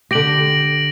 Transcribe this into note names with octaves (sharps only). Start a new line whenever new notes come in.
D3 G4 A#6 D7 F#7